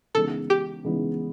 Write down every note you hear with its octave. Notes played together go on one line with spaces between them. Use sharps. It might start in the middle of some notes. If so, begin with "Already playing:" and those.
C#3 E3 G#3 B3 D#4 A4
G4
C#3 E3 G#3 B3 D#4